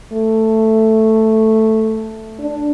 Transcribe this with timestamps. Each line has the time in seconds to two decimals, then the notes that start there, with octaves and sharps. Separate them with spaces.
0.13 A3
2.40 D4